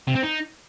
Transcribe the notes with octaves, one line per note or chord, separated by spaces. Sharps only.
C3
C4
D#4